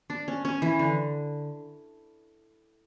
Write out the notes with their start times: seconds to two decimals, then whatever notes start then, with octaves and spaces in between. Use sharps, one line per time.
0.10 D4
0.28 C#4
0.45 C#4
0.62 E3
0.79 D3